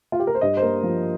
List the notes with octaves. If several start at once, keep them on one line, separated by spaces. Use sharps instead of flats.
F4
G4
A#4
C5
G2 D#5
C5
A#3 A#4
F3